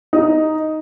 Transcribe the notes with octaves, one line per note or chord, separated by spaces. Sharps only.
D#4